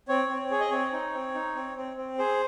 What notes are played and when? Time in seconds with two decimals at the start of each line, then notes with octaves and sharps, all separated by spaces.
0.09 C4 C#5
0.29 C4
0.50 G#4 C#5
0.60 D#5
0.70 C4 C#5
0.93 D#4
1.14 C4
1.34 D#4
1.56 C4
1.76 C4
1.97 C4
2.18 G#4 C5